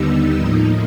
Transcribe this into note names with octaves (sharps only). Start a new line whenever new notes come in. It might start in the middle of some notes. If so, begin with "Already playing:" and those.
Already playing: D#2 D3 G3 B3 D#4 E6
A2 F3 A#3 D#4 D#6